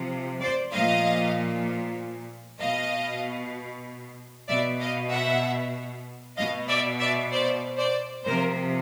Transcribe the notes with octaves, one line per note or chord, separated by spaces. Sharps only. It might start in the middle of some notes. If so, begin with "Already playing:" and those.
Already playing: C3 F3
C5 D5
A#2 F3 D#5 F5
B2 D#5 F5
B2 D5 E5
D#5 F5
E5 F#5
B2 D#5 F5
D5 E5
D5 E5
C5 D5
C5 D5
C3 F3 A#4 C5